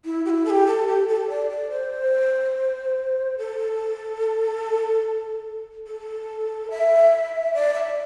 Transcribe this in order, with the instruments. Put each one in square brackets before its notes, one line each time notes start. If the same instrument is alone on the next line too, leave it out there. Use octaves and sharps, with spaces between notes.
[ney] E4
G4
E4
A4
G4
A4
G4
A4
D5
D5
C5
A4
A4
E5
D5
E5